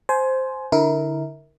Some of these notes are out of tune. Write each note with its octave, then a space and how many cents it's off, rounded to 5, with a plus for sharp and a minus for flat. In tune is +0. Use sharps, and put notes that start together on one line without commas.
C5 +0 G#5 +25
D3 -10 E4 -30 A#4 +0